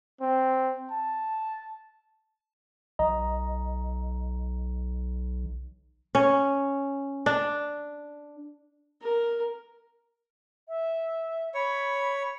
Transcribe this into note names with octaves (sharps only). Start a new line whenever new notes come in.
C4
A5
B1 D#5 A#5
C#4
D4
A#4
E5
C#5 B5